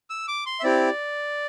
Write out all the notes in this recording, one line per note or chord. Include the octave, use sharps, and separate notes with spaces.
E6
D6
C6
E5
C4 E4 G4 D5